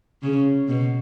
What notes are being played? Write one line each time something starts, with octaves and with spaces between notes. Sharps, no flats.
C#3
B2